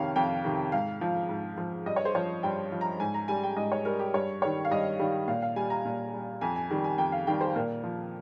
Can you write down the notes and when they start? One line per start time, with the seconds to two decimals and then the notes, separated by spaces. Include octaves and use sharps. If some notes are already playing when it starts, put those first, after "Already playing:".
Already playing: F2 C3 D#3 C#5 F5
0.16 F2 G5
0.44 C3 D#3
0.72 G#2 F5
1.01 F3
1.29 G#2
1.57 F3
1.86 G2 D#5
1.96 C#5
2.05 C5
2.15 F3 C#5
2.43 G2 G5
2.72 F3
2.81 A#5
3.00 G#2 G#5
3.14 A#5
3.28 G3 G#5
3.44 G5
3.57 G#2 D#5
3.72 C#5
3.85 G3 A#4
4.00 G4
4.14 G2 C#5
4.42 D#3 G3 C#5
4.65 F5
4.71 G2 D#5
4.99 D#3 G3
5.28 A#2 F5
5.42 F5
5.56 G3 G#5
5.70 A#5
5.85 A#2
6.13 G3
6.41 F2 G#5
6.56 G#5
6.71 D#3 G3
6.84 G#5
6.98 F2 G5
7.12 F5
7.27 D#3 G3 G5
7.41 C5
7.55 A#2 A#4
7.84 F3